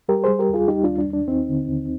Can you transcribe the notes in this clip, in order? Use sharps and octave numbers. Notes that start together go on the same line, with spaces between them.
G3 G4 A#4
G3 G#4 C5
G4 A#4
D#2 F4 G#4
G3 D#4 G4
D#2 D4 F4
D4
D#2
D4
D#2 C4 D#4
D3
D#2